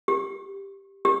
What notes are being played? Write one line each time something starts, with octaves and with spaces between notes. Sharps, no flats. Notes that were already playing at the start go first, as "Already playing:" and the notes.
G4
G4